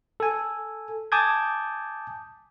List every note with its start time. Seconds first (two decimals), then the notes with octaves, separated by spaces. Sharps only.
0.20 A4 G#5
1.12 G#5 A5 D6 D#6 G6 G#6